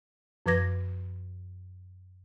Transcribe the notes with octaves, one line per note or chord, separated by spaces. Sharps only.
F#2 F3 B4 D6 G#6 A#6